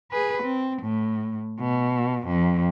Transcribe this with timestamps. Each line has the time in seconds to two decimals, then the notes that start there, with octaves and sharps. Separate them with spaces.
0.11 G#4 B4
0.43 C4
0.83 A2
1.60 B2
2.26 F2